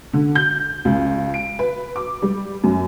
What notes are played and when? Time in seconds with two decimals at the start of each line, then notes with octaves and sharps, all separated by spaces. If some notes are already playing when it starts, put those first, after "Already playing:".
0.13 D3
0.35 G6
0.85 C#2
1.34 D7
1.59 B4
1.96 D6
2.22 G3
2.64 F#2